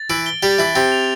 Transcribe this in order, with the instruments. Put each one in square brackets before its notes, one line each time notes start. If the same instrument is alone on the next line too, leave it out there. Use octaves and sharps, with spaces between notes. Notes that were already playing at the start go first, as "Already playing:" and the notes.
Already playing: [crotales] A6
[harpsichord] E3 E4 [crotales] D7
[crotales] G7
[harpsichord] G3 G4 [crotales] A6
[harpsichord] E3 E4 [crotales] A6
[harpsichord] C3 C4 [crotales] A6
[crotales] F7